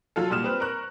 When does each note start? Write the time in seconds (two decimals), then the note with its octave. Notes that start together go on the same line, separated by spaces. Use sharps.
0.16 F#3 F4 A4
0.30 A#2 G3 D#6 F6 E7
0.44 C4 B4
0.60 A#4 C#6 F#6